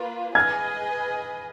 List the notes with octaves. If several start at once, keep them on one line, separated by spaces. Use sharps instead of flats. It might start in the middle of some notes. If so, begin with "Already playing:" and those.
Already playing: A#3 F4 B4
G#4 B4 D#5 G#5 F6 G#6